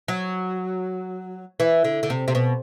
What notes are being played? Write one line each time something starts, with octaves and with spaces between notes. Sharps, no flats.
F#3
E3
D3
D3
C3
C3
B2